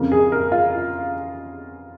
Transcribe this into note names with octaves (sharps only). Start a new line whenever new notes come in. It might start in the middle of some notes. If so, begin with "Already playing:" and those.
Already playing: F2 C#3 F3 A#3
G#4
A#4
F4